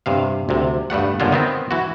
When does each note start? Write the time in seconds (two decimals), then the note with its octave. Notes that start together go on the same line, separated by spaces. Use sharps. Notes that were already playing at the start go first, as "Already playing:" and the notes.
0.06 G2 C3 F5
0.49 D2 C3
0.90 G2 G3 A3 F#5
1.20 F#2 B2 D3 G#3 F4
1.32 D#3 B3 C4
1.71 E3 F#4